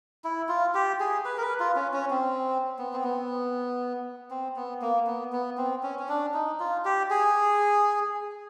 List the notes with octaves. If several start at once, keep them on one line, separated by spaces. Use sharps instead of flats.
E4
F4
G4
G#4
B4
A#4
B4
F4
C#4
C#4
C4
B3
C4
B3
C4
B3
A#3
B3
B3
C4
C#4
C#4
D4
D#4
F4
G4
G#4